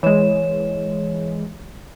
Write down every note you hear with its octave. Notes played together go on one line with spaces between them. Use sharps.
E3 G#3 C#5 E7